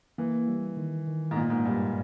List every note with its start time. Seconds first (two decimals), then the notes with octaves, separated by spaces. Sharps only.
0.18 E3 A#3
0.48 G3
0.77 D#3
1.07 D#3
1.31 G#2
1.35 A#2 A#3
1.50 G#2
1.65 G2 G3